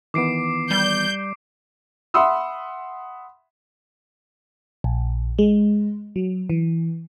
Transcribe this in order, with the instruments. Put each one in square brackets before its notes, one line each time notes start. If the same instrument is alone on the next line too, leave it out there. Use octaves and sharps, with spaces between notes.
[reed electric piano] D#3 E3 B3 [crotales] D6 C7 D7
[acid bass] G3 [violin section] G6
[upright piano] E5 F#5 B5 C6 D#6 E6
[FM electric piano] A#1
G#3
F#3
E3